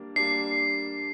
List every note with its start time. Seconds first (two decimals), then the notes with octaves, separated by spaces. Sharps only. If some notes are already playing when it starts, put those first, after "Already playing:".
Already playing: G3 A#3 D4
0.16 G3 A#3 D4 C7